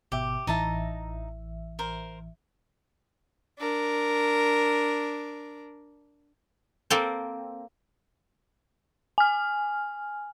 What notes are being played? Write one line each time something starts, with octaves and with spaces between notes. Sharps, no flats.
G#1 B2 G4 E5
A1 E3 D#4 E5 A5 A#5
A#4 C5
D4 A#4
A#3 C4 A4 C5
G#5 F6